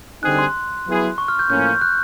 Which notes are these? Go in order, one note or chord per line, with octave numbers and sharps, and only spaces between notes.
D3 G3 C4 D#4 G#4 F#6
C6
F#3 B3 E4 G#4
C#6
F6
G6
A2 F3 A#3 C#4 G6
G6
F#6